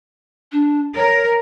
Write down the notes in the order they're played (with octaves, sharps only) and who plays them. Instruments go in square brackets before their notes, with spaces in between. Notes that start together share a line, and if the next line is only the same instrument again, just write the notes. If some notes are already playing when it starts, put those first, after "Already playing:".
[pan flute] D4
[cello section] A#4 [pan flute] C#5